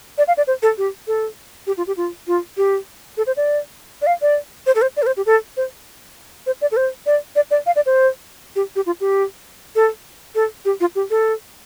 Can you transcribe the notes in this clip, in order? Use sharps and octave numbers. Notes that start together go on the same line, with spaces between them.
D5
F5
D5
C5
A4
G4
A4
G4
F4
G4
F4
F4
G4
A4
C5
D5
D5
F5
D5
C5
A4
C5
D5
A4
C5
G4
A4
C5
C5
D5
A4
C5
D5
D5
D5
F5
D5
C5
G4
G4
F4
G4
A4
A4
G4
F4
G4
A4